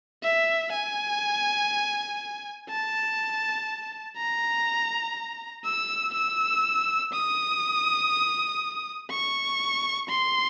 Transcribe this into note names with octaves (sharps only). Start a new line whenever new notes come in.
E5
G#5
A5
A#5
E6
E6
D#6
C#6
C6